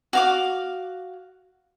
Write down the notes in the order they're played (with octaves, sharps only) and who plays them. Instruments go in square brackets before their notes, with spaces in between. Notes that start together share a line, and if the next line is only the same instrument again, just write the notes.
[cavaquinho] F#4 F5 D6